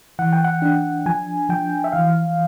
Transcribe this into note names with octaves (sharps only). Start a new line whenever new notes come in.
E3 F#5
G5
F#5
D4
F3 G#5
F3 G5
E5
E3 F5